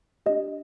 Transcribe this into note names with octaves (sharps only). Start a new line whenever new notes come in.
D4 G4 D#5